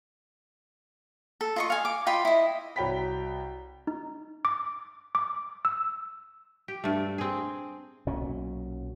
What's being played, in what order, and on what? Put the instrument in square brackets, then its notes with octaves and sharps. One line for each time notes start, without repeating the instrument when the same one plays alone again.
[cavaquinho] A4
F4 D#5 C#6
F5 G#5
D6
F4 D#5 G5 B5
E4 D#5
[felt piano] C2 F#4 C#5 G5 B5 B6
[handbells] D#4
D6
D6
E6
[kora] G4
G2 A3
C4 G#4
[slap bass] B1 A#2 F#3 C#4